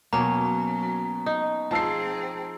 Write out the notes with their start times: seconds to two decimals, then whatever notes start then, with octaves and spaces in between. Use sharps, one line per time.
0.13 B2 F#3 A#3 C#4 A#5
1.26 D#4
1.71 F3 C4 F4 G#4 A5 E6 C7